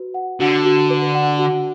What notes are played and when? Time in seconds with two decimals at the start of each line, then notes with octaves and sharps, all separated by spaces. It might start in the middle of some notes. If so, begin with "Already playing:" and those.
Already playing: F#4 B4
0.14 F#5
0.40 D3 F#4
0.65 F#4
0.90 B4
1.15 F#5
1.39 F#4